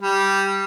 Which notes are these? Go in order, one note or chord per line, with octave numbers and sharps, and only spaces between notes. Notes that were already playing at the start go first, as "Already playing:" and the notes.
G3